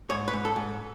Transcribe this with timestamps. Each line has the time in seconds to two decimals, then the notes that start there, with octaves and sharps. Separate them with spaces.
0.10 G#2 C#5
0.28 B4
0.33 G#2
0.45 A4
0.56 G#2